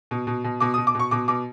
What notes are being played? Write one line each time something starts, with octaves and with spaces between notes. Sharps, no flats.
B2
B2
B2
B2 D6
D#6
B2
D6
B2 C#6
B2 D6
B2 D6